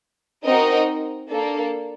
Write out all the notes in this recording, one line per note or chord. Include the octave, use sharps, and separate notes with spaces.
C4 D#4 F#4 A#4 D#5
A#3 D4 A4